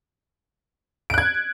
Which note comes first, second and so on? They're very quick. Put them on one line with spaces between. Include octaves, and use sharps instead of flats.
D7 F#6 G#6